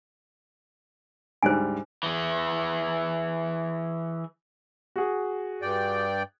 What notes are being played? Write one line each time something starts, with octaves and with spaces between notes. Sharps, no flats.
D2 G#2 G3 C5 G#5
E3 G#4
F#4 G#4
G2 D5 G5